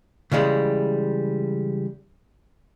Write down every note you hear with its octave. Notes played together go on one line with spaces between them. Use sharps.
C#3 E3 G3 G#3